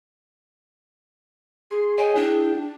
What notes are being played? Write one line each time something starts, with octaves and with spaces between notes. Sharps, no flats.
G#4 C6
C#5 D#5 G5 G#5
D4 E4 G5